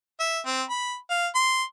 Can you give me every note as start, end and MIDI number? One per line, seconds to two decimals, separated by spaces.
0.20 0.40 76
0.46 0.63 60
0.70 0.96 83
1.10 1.27 77
1.35 1.63 84